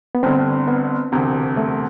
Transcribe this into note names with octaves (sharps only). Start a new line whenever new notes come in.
B3
G1 G2 D3 C4
B3
E1 D2 C3
A3